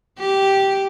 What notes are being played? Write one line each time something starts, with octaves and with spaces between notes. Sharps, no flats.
G4